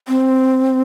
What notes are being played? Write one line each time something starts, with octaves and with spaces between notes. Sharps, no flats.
C4